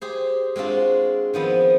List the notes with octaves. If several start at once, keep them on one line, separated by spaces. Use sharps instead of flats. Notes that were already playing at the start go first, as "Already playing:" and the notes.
G4 G#4 C5
G#3 C4 D4 F4 F#4
D#3 F3 B3 C4